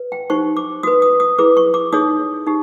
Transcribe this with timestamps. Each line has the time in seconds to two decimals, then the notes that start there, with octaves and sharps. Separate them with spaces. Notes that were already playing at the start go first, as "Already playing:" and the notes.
Already playing: B4
0.12 G5
0.30 D#4 G4 C5 C#6
0.57 D6
0.83 F#4 B4 D#6
1.02 D#6
1.20 D#6
1.38 E4 G#4 B4 D6
1.57 C#6
1.74 D6
1.93 D#4 G#4 C#5 D#6
2.47 D#4 G4